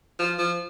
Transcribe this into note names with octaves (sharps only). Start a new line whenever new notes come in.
F3
F3